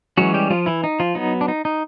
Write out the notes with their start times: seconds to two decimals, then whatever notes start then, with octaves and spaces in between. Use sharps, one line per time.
0.17 E3 F#3 G#3 C#4 F#4
0.34 G3 G4
0.50 F3 F4
0.66 E3 E4
0.84 D#4
1.00 F3 F4
1.15 F#3 B3 D#4
1.41 D4
1.48 D#4
1.65 D#4